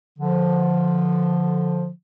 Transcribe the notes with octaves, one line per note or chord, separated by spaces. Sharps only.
D3 F3